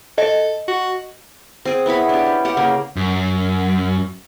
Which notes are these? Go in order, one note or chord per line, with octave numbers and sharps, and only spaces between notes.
A4 D#5
F#4
C4 G#4
B3 E4 C#5 B5
D4 G4
C#4
G4 F#5
C#3 A#3
F#2